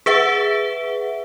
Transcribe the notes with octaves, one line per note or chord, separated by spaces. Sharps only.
G#4 B4 E5 F#5